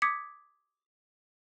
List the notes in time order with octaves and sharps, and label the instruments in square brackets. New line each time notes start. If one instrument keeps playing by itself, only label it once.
[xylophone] D6 D#6 G#6 B6 C#7